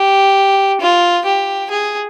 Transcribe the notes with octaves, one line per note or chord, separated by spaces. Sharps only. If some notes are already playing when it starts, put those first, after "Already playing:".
Already playing: G4
F4
G4
G#4